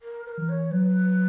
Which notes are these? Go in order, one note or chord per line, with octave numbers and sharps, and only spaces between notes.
A#4
B4
A#4
E3
C#5
F#3 B4